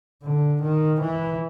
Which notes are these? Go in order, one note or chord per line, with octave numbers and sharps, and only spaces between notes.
D3
D#3
E3